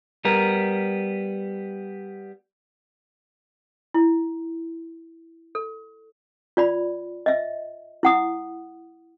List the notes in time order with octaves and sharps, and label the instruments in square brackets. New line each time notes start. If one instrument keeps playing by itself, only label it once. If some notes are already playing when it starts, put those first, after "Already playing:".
[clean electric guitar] G3 B3 A#4
[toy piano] E4
A4
F4 D5 B5
D#5 E5
E4 F#5 D#6